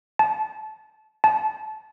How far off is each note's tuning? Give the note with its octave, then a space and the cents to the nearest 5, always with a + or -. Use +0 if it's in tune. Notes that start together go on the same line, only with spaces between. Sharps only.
A5 -25
A5 -25